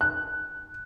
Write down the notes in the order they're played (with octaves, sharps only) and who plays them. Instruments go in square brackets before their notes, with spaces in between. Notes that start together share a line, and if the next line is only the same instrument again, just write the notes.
[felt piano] F#6